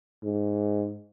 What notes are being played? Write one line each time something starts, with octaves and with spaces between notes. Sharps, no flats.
G#2